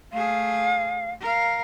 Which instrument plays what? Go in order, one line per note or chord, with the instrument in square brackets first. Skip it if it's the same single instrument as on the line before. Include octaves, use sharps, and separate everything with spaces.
[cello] A3 G#4 [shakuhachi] F5
[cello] A#4 F5